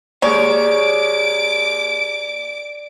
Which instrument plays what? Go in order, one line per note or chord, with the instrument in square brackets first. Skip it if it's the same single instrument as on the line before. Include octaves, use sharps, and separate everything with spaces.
[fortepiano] D#2 G#3 [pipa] C#5 [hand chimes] D5 [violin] D6 D7